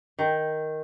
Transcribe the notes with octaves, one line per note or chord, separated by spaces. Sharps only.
D#3